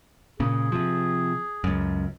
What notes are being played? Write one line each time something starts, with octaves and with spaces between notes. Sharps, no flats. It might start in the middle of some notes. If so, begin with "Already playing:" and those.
A#2 C#3 G#4
C3 F3
C#2 F#2